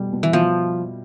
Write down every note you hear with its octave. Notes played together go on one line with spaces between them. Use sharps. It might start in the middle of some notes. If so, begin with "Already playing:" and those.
Already playing: B2 G3
B2
E3
B2 F3